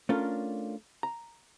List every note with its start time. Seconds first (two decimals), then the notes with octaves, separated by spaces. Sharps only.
0.09 A3 C#4 D4 F4 A4 A#4
1.03 A#5